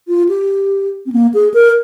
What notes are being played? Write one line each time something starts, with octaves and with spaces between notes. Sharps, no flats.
F4
G4
C4
A#3
G#4
A#4